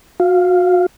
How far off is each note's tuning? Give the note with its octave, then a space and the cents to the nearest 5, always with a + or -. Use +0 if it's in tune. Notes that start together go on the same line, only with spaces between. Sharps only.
F#4 -30 F5 -5